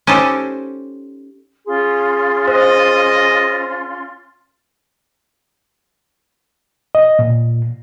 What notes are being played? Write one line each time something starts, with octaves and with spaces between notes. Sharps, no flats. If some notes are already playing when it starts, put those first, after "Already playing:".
C#4 D#4 G4 A4 C5
C#4 F4 G#4 C6
C5 D#5
D#5
A#2